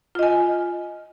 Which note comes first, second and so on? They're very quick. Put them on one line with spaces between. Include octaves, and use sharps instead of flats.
F4 D#5 G#5